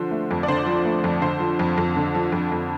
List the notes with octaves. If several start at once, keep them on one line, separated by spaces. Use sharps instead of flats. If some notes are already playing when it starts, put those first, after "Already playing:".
Already playing: D3 F3 C5
A3
F2
D5
D3 C5
F3
A3
F2
D3 C5
F3
F2
F2
D3
F3
F2
F2